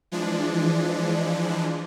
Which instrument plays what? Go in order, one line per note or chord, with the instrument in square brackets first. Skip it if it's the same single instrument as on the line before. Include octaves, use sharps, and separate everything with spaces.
[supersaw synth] E3 F3 G#3 D4